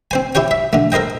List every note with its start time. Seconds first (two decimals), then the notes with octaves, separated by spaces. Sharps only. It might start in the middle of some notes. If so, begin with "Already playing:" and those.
0.11 C4 C5 G#5
0.35 E4 G4 C#5 G5
0.51 E5
0.73 D3 A3
0.92 A4 A#4 C5 D#5 G5